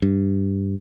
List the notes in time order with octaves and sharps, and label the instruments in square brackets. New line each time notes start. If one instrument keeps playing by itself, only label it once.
[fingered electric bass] G2